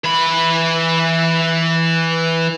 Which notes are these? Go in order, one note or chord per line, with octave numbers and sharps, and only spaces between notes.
E3 B5